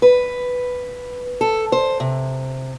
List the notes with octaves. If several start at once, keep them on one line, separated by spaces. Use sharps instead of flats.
B4
A4
C5
C3